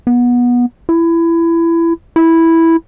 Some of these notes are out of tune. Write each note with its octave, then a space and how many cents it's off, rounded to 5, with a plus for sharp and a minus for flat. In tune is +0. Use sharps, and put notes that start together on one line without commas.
B3 -20
E4 +20
E4 -5